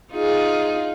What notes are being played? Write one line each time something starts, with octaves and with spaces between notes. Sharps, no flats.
D#4 F4 G#4